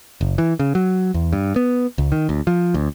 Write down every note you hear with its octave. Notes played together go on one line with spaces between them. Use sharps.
F#1
E3
C#3
F#3
E2
G2
B3
C#2
D#3
D2
F3
D2